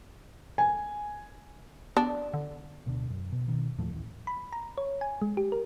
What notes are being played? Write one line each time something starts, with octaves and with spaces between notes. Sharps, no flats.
G#5
B3 D4
D3
D1 B2 D3 D4
F#2
B2
B2 D#3
D#2 A2 F3 A3
A1 D#2 B2
B5
A#5
C#5
G#5
G#3
G4
A#4